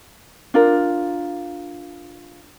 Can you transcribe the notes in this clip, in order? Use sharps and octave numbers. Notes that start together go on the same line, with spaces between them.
D4 F4 A#4